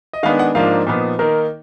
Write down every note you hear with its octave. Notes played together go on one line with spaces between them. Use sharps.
D#5
D#3 G#3 B3 D4 F5
F#5
G#2 F3 A#3 D4 F5
A#2 F3 B3 D#4
D#3 A#3 D#4 A#4